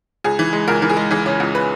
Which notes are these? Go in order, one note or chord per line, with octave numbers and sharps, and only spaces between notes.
C#2 G#4
E3
G#3
C#2 A#4
E3 A#4
G#4
G#3
E3 G#4
C#3
C#2
B4